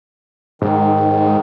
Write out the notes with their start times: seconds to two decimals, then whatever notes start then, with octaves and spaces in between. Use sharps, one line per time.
0.62 G#2 D#3